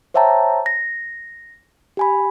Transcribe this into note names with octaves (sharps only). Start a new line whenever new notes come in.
C5 C#5 E5 G5 A5 A#5
A#6
G4 G#5 B5